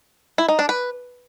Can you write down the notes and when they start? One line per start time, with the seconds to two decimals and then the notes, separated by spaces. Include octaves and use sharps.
0.38 E4
0.49 D#4
0.59 D4
0.69 B4